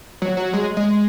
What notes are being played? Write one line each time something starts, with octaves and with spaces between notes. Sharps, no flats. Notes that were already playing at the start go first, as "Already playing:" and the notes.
F#3
F#3
G#3
G#3